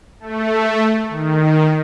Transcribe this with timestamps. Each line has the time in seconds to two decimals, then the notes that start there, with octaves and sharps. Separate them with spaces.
0.20 A3
1.09 D#3